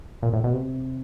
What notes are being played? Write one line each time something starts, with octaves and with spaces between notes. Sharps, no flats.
A#2
A2
B2
C3